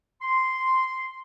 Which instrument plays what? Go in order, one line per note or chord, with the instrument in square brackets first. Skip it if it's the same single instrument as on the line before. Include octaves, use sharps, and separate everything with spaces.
[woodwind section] C6